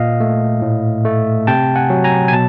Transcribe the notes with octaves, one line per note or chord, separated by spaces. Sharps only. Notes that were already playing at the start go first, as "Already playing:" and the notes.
Already playing: A#2 D#5 F5
A3
A2
A3
C3 G5 A5
F#5 G#5
F#3
G#5 A#5
G#5
B2 A5